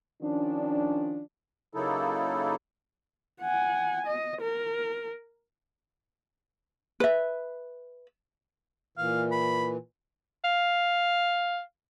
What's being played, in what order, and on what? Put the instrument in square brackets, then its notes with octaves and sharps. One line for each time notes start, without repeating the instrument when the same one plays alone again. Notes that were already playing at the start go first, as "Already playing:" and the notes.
[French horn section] D#3 F3 C#4 D4
[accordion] C#3 F#3 A#3 D#4 E4 A4
[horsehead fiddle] F#5 G#5
D#5
A#4
[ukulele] B4 E5
[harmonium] A#2 E3 [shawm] F5
[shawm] B5
[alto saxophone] F5